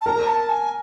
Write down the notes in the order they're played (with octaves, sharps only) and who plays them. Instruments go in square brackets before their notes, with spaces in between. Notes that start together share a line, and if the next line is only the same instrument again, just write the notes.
[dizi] A5
[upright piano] A#4 [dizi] A#5
[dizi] A5
G#5